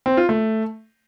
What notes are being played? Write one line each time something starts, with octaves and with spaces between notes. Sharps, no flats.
C4
F4
A3